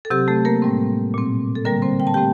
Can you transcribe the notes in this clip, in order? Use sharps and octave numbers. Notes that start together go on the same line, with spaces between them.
A4
C3 F#3 C4 G4
A3 A4
A#3 A#4
A2 G3 C4
A#2 F#3 C4
A4
D3 G3 A#3 C4 A#4
C4 C5
G5
A5
A3 C4 G4 G5